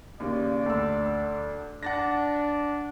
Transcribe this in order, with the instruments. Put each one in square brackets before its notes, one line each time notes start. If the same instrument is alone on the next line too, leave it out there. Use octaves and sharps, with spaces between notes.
[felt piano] D#2 C#3 [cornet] D5
[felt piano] D2 E6
[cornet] D4 [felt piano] F#5 A6 A#6